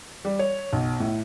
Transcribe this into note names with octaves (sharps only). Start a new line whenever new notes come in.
G3
C#5
B1
A2